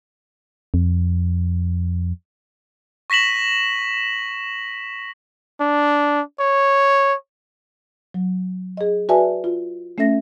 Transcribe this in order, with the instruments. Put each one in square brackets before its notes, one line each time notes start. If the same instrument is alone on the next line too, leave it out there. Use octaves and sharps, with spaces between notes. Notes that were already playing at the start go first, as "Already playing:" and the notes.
[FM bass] F2
[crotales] C#6 A#6 B6 E7 F#7
[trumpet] D4
C#5
[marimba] F#3
G#4 D#5
F#4 B4 D5 E5 G#5 A5
F4
A3 C#4 A4 E5 A#6